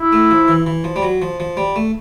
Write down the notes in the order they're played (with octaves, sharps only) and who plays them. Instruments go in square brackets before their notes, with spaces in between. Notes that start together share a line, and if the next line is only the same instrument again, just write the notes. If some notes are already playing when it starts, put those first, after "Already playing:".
Already playing: [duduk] E4
[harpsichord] A3
F3
E3
E3
F3
G3
F#3
F3
F3
G3
A3